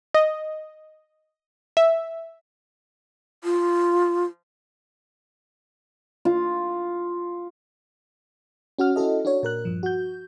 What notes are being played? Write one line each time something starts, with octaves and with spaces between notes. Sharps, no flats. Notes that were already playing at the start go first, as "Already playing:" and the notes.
D#5
E5
F4
F4
C#4 F#4 F#5 F6
C#4 E4 F#4 A4 D#5
D4 F#4 C#5
A#2 A#4 F#6
G2 F3
F#4 G6